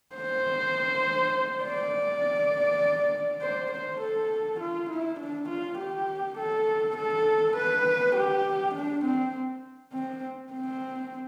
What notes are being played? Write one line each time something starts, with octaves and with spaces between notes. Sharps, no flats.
C5
D5
C5
C5
A4
F4
E4
D4
F4
G4
A4
A4
B4
G4
D4
C4
C4
C4